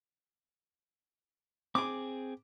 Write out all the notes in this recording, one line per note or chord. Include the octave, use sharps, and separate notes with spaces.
C4 G#4 D6